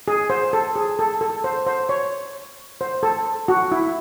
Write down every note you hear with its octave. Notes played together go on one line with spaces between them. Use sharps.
G#4
C5
A4
G#4
A4
A4
C5
C5
C#5
C5
A4
F#4
E4